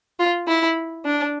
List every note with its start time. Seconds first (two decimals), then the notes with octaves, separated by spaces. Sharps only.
0.19 F4
0.48 E4
1.05 D4